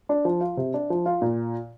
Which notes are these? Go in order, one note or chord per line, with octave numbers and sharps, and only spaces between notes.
D4
F3
F4
C3
D4
F3
F4
A#2